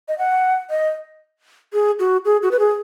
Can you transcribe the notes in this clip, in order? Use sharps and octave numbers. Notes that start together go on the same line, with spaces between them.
D#5
F#5
D#5
G#4
F#4
G#4
F#4
B4
G#4